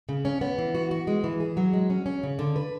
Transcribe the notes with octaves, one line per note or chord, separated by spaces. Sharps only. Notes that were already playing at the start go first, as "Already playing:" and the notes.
C#3
C#4
B3
E3
F#4
F#4
G#3
E3
G#4
F#3
G#3
C#4
C#4
C#3
D3
B4